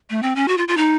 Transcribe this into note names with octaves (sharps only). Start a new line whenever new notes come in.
A3
C4
C#4
F#4
F4
F4
D#4